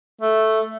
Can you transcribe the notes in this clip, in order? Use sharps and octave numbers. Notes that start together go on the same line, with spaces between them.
A3